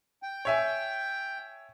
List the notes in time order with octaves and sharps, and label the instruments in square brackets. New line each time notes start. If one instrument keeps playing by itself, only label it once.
[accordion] G5
[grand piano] C#5 E5 G#5